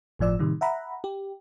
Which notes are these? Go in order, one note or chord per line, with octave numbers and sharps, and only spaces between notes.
G1 A2 F3 D5 E6
A2 C3 D#3 G3
E5 F#5 A#5 B5
G4